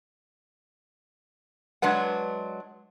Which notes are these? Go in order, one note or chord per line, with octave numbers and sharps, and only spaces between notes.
F#3 G#3 D4 B4 F#5